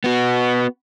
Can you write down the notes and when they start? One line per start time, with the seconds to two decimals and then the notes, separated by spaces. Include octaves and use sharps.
0.04 B3 F#4